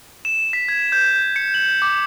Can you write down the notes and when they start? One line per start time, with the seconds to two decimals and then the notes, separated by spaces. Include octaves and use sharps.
0.25 E7
0.53 B6
0.69 G#6
0.92 G6
1.36 C#7
1.54 F#7
1.82 D6